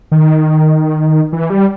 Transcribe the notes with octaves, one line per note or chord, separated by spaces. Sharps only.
D#3
E3
G3